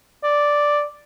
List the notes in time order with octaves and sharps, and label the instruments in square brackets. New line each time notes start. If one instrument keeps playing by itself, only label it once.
[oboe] D5